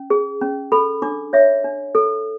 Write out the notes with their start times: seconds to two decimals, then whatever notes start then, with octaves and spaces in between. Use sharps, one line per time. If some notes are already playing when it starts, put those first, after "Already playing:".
Already playing: C#4
0.10 G#4
0.41 C#4
0.72 A4 B5
1.02 D4 D6
1.33 C#5 E5
1.64 D4
1.95 A4